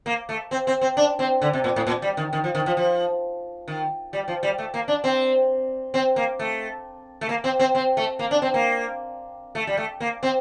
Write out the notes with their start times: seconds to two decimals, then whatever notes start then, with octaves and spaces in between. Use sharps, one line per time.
0.06 A#3
0.29 A3
0.51 C4
0.67 C4
0.81 C4
0.97 D4
1.19 C4
1.42 D3
1.53 C3
1.64 A#2
1.76 A2
1.87 A#2
2.02 G3
2.17 D#3
2.33 D#3
2.44 F3
2.55 D#3
2.66 F3
2.77 F3
3.68 D#3
4.13 G3
4.28 F3
4.43 G3
4.58 A3
4.74 A#3
4.88 D4
5.04 C4
5.94 C4
6.16 A#3
6.39 A3
7.21 A3
7.29 A#3
7.44 C4
7.60 C4
7.75 C4
7.97 A3
8.19 A#3
8.31 D4
8.42 C4
8.54 A#3
9.55 A3
9.67 G3
9.77 A3
10.00 A#3
10.23 C4